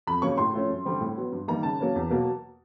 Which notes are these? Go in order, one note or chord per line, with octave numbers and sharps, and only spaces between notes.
F2 B5
C#3 F#3 A#3 C#4 C#6
A2 C6
F3 A3 C#4
F#2
D3 G3 C4
A2
F#3 B3
G2
D#3 G3 A#3 A#5
C#3 A5
F#3 A#3 C#4
E2
B2 F#3 A#3